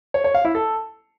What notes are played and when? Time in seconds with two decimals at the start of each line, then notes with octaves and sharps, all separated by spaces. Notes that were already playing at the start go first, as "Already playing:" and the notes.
0.14 C#5
0.24 C#5
0.34 F5
0.45 E4
0.55 A4